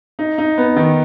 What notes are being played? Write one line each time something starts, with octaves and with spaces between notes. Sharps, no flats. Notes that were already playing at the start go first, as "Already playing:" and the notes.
D#4
D#4
B3
D#3